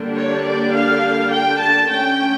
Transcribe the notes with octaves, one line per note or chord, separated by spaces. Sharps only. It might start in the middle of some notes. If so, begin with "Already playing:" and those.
Already playing: D3 G3 A#3 D4
C#5
D5
F5
G5
A5
D3 A3 C#4 G5